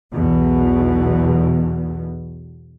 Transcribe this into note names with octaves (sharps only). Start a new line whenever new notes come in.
B1 E2 B2